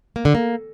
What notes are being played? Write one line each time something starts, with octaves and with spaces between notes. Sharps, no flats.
A#3
D3
A#3